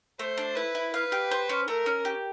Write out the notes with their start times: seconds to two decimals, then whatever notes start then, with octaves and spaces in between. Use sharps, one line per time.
0.19 A3 C5
0.38 D4
0.56 E4 B4
0.75 E4
0.93 B4 F5
1.12 G4
1.31 C5
1.49 C#4
1.68 A3 A#4
1.86 C#4
2.05 G4